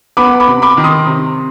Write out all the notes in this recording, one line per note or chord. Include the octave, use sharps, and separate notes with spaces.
B3 B5 D6
B5 D6
C3
B5 D6
D#3
C6 D#6
C3